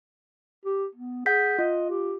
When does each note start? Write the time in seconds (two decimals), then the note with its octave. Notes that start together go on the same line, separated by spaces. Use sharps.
0.65 G4
0.95 B3
1.26 G#4 F#5 G6 B6
1.58 F4 D#5
1.89 G4